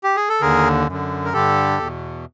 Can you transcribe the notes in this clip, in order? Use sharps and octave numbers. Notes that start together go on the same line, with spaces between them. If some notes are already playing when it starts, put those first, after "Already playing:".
G4
G#4
A4
D#2 D3 G#4 A#4
F#2 D3
A#4
G2 D3 G4 A4
E2 B2